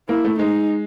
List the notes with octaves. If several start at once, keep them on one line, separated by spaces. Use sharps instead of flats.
A#3 E4
A3
G#3 D#4